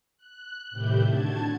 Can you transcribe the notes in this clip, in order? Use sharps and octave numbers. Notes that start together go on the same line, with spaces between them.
F#6
A2 C3 D#3 E4 G4 G6
D3 F#4 A5 G#6